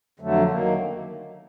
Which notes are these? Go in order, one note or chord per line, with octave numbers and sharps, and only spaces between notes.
F2 D3 F#3 A3
D#3 F#3 A#3